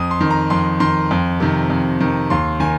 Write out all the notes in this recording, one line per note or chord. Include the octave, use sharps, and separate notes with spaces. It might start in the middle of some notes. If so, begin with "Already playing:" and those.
Already playing: F2 D#6
C6
D#3
A#5
F2 C6
D#3 C6
F2
C3 D#3
F2
C3 D#3
D#2 C6
D#3 G#5